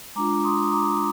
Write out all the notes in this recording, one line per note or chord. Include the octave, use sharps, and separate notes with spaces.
G#3 D4 F4 A#5 D6
C6 D#6
D#6
A#5 D6